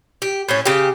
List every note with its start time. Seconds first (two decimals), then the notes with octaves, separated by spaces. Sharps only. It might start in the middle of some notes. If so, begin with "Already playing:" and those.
0.22 G4
0.48 A2 A3 C#4
0.66 C#3 G4